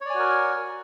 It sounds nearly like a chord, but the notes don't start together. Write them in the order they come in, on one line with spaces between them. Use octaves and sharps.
C#5 D5 G#5 F#4 A#4